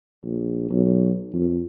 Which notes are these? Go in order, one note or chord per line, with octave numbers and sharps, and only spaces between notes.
A#1
B1
F2